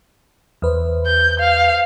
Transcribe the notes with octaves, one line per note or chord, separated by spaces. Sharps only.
E2 B4 C5
G6
F5